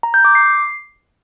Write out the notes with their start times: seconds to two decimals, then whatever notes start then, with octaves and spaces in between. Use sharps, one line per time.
0.03 A#5
0.14 G6
0.25 D6
0.35 C7